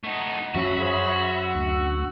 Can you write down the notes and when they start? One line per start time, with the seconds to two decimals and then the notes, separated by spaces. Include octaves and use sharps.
0.04 A3 D#4 D#5 F#5
0.55 F#2 F#3 C#4 F#4 E5 F5 B5 C#6
0.78 F#2 G#4 C5 C#5
1.35 F#5 E6
1.55 D2